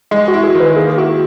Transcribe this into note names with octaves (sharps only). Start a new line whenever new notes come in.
G#3 D#5
F#4
E4
G#4
D#3
B4
A#3 G#4
E4 F#4